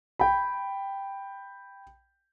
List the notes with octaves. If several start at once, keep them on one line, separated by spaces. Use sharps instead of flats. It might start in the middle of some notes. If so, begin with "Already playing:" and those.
G5 B5